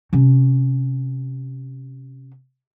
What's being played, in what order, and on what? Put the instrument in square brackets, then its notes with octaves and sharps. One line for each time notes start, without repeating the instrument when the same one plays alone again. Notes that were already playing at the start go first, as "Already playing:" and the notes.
[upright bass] C3 C#4